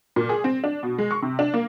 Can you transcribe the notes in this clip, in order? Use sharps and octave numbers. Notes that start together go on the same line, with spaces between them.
A#2
G#4
C4
D4
B2
G#3
C#6
C3
D4
A#3